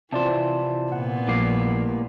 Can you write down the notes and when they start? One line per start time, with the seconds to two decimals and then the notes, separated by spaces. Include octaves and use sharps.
0.13 C3 E3 F4 C5 D5 A5
0.92 A#2 B3 F#5
1.28 A#1 A2 G3 A#3 D6 C7